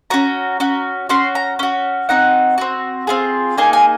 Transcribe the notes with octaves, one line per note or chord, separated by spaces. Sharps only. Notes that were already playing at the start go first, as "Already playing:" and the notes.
C#4 F#4 A#5
C#4 F#4
C#4 F#4 C6
A#5
C#4 F#4
C4 D#4 F#4 F#5
C4 F#4
C4 F4 G#4
A#3 D#4 G#4 G#5
G#5